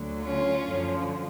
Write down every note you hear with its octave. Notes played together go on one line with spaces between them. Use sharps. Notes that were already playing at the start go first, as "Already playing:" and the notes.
Already playing: D2 D3 F#3
C#4 F4
F#2 D3 F3